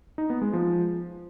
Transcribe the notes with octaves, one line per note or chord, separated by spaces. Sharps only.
D#4
B3
G#3
F3